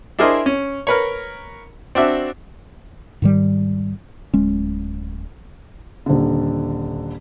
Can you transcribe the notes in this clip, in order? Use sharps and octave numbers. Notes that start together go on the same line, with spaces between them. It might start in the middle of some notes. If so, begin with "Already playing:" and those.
D4 E4 G#4 A#4 C5 D#5
C#4
A#4 B4 C#5
C4 D4 F#4 E5
G#2 D#3 G3
D1 G#3 C#4
D#1 D3